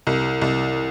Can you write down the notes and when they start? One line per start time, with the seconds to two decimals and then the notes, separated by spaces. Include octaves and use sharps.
0.07 C2
0.41 C2